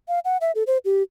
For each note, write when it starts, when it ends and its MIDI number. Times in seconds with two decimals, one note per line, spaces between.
0.08 0.19 77
0.25 0.37 78
0.41 0.52 76
0.55 0.63 69
0.67 0.78 72
0.85 1.03 67